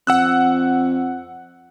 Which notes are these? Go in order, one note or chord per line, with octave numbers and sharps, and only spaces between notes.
F2 F#5 E6 F#6